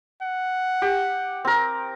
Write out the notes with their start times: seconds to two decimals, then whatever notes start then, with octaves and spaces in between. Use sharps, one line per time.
0.22 F#5
0.82 G4
1.45 C4 A#4